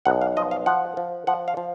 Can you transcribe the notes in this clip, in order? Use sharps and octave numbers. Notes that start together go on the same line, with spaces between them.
B1 F#5
F5
F3 D#5
F5
F3 F#5
F3
F3 F#5
F5
F3